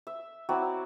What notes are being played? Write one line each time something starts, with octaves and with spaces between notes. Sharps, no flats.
E5
F#3 C4 E4 D5